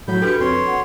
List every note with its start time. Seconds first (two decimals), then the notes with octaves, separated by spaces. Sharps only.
0.08 A2 F#3 F#4 B5 G6
0.22 D4 F#4 G4 A4 B4 C#7
0.40 F2 B4 C#5 C6
0.66 F#5